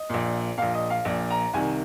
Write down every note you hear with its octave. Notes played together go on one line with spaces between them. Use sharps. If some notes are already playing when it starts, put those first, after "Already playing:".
Already playing: D#5
A#1 A#2
A#1 A#2 F5
D#5
F5
A#1 A#2
A#5
C2 C3 D#3 G#5